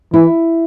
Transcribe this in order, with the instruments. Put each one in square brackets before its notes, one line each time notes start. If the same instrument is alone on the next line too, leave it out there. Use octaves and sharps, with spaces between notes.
[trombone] E3 [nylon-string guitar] E4